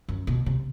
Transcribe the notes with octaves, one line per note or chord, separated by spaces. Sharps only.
F#2
B2
C3